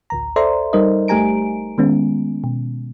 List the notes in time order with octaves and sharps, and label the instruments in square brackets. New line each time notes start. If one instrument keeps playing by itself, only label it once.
[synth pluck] A1 D2 A#5
A4 C5 D5 E5 A#5 C6
G3 D#4 A#4 C5 D#5
G1 A3 G4 G#5 A#5 D7
D#3 G#3 B3 C#4
B2